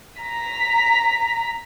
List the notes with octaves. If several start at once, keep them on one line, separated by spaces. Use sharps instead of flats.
A#5 B6